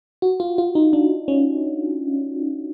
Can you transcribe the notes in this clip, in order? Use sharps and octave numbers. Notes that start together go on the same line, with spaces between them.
F#4
F4
F4
D#4
D4
C#4